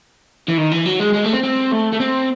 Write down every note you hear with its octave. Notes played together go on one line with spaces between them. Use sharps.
E3
D#3
E3
F#3
G#3
G#3
A3
C4
C4
A3
A3
C4